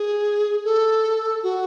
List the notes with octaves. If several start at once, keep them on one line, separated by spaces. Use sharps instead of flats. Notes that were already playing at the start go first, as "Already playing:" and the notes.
Already playing: G#4
A4
F#4